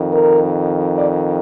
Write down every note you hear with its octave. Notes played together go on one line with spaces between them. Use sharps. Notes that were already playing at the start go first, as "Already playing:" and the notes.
Already playing: F2 D#3
A#4
D5